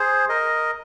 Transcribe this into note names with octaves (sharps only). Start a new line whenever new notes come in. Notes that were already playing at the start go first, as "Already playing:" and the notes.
Already playing: G#4 C5
A#4 D#5